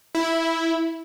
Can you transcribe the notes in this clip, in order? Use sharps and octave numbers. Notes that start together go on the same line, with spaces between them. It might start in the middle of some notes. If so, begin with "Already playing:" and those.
E4